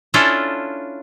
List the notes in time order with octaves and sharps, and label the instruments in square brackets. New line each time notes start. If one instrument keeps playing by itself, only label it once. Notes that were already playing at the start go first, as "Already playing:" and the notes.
[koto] C#4 D4 E4 F4 A4